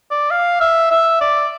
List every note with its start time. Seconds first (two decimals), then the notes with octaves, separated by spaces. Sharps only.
0.11 D5
0.31 F5
0.61 E5
0.91 E5
1.21 D5